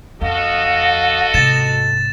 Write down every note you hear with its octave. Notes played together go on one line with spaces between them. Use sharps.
F2 F#4 A4 D#5 F5
G#2 C3 A6 E7